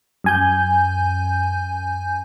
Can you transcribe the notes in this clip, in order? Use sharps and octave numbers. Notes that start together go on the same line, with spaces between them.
F#2 G#5 G6